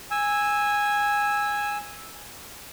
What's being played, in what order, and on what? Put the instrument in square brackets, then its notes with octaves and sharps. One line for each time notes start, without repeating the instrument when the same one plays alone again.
[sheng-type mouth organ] G#5 E6